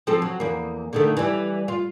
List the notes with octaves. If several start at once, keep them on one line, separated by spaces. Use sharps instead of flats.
F3 C4 A4
F#3
E2 A#3
D3 D#3 A3
E3 G3
F4